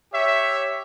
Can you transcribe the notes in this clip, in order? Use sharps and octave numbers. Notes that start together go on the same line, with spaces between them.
G4 C#5 E5